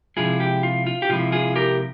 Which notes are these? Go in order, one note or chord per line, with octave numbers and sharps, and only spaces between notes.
C3 F3 G#3 E4 F4 G#4
G4
F4
F4
G4
C3 F3 G#3 E4 F4
F4 G#4
G4 A#4